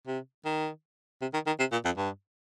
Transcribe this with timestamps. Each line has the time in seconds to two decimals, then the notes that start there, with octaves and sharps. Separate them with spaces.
0.07 C3
0.45 D#3
1.21 C3
1.33 D#3
1.47 D#3
1.59 C3
1.72 A#2
1.85 F2
1.97 G2